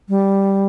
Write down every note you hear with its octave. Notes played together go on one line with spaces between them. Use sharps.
G3